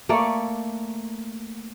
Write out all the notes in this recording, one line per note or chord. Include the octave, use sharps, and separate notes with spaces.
A3 A#3 C#5 D5